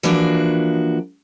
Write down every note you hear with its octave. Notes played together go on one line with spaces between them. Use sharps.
E3 F3 A#3 D4 F#4